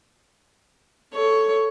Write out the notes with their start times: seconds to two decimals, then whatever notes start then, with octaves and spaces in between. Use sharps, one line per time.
1.14 A4 C#5